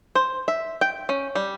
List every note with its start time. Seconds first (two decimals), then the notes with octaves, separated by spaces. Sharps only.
0.15 C5
0.48 E5
0.81 G5
1.09 C#4
1.35 G3